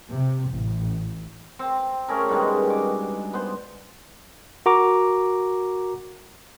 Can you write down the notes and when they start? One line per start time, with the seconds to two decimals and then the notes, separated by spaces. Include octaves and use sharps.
0.10 C3
0.49 A1
1.59 C4
2.08 A3 C#4 G#4 A#4
2.29 G2 B2 D#3 G#3
2.70 D6
3.33 B3 C5
4.66 F#4 A#4 A#5 D6